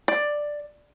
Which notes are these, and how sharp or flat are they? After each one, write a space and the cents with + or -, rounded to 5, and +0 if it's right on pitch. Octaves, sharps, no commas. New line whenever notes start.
D5 +5